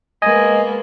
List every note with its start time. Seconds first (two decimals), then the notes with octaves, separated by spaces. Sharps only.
0.22 G#3 A#3 B3 D#5 G#5